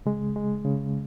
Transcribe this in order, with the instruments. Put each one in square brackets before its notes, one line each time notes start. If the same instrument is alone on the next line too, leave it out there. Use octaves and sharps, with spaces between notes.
[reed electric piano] C#3 G#3
G#3
C#3